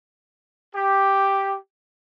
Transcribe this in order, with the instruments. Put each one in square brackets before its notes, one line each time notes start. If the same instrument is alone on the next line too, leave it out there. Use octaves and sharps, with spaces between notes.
[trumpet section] G4